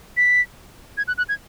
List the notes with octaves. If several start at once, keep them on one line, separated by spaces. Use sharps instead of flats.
B6
G#6
F#6
F#6
G#6